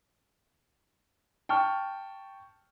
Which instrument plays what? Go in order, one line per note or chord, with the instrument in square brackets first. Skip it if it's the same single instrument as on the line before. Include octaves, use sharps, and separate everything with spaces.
[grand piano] G5 A5 C#6 F6